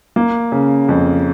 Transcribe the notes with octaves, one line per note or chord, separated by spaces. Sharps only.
A#3
C#3
F2